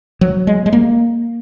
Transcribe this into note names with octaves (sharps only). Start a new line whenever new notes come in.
F#3
G#3
G#3
A#3